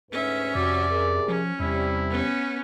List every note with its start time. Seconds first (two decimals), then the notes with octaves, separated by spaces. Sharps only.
0.11 D2 G#2 C#4 B4 E5
0.55 F2 C3 F#4 D5
0.90 C3 G#4 A#4
1.28 F3 C#4
1.60 E2 C3 G3 E4
2.10 B3 C#4